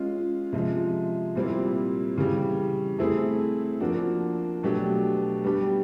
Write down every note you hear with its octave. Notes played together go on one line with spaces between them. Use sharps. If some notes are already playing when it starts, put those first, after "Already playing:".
Already playing: G#3 C#4 F4
C3 F3 G#3
A#2 G3 C4 E4
C#3 E3 G3
A3 C4 E4 G#4
F3 A#3 D4 F#4
B2 F#3 A3 D4 G4
G3 B3 D4 G4